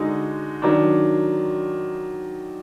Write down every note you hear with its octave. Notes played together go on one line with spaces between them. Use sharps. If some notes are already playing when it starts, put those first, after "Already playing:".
Already playing: D3 G#3 D#4 F#4
D#3 F#3 D4